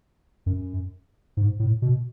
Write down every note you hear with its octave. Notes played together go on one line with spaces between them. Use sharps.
F#2
G#2
A2
B2